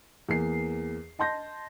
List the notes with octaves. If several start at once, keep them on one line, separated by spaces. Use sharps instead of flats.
E2 A#3 C7
D#5 A5 C6 G6 A#6